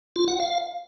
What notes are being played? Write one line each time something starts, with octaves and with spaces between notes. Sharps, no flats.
F4
F#5
F5